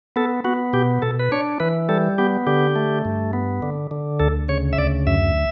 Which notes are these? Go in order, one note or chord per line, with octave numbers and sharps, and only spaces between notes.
B3 A4
B3 F#4
B2 G4
B2 A4
B4
D4 C#5
E3 B4
G3 A4
B3 G4
D3 G4
A3
G2
B3
D3
D3
D2 A4
C#3 C#5
E5
D2 D5
F#2 E5